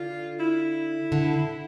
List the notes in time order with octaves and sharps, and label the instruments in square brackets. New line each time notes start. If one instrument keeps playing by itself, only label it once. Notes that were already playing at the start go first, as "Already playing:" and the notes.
Already playing: [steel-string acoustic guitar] D3 [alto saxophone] F4
[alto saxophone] E4
[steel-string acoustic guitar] D3